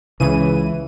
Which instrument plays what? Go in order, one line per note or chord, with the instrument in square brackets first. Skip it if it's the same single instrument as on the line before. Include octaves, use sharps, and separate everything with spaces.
[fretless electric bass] C#2 [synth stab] C#3 D#7 [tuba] E3